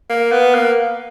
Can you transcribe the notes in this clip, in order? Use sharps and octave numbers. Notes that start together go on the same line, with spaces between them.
A#3
B3
A#3